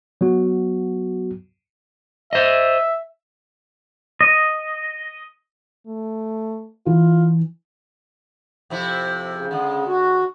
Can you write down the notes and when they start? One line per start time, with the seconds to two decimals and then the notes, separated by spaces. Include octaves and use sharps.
0.21 F#3 B3 F#4
2.33 C5 D#5 E5
4.21 D#5
5.87 A3
6.86 E3 F4
8.70 F2 C3 E4
9.34 C#3
9.51 D3 G#3
9.87 F#4